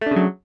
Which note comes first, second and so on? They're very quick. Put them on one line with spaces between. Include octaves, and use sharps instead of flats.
A3 D4 C#3 F#3